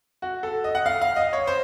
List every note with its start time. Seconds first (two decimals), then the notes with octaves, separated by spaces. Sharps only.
0.22 F#4
0.43 A4
0.64 D#5
0.75 F#5
0.86 F5
1.02 F5
1.16 D#5
1.33 C#5
1.47 C5